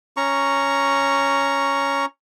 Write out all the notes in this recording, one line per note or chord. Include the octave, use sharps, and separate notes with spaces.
C#4 A#5 C#6